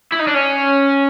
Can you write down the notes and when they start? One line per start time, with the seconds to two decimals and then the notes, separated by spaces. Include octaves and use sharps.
0.12 E4
0.20 D#4
0.27 D4
0.34 C#4